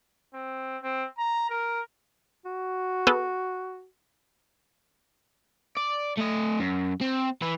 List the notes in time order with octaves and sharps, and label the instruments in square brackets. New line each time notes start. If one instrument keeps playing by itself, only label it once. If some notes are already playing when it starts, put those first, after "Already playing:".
[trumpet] C4
C4
A#5
A#4
[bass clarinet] F#4
[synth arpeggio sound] B3 G#4 A4
[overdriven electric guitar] D5
A3 D#5
F#2
C4
E3 E4